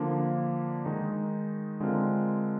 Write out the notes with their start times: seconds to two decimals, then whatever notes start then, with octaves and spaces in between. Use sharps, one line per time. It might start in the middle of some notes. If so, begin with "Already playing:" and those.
Already playing: D3 F3 A#3 D4
0.85 D#3 G#3 D#4
1.80 D3 G#3 C4 F4 A#4